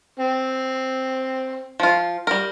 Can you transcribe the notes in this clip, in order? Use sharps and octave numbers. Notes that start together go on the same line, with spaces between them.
C4
F3 F4
G3 A#4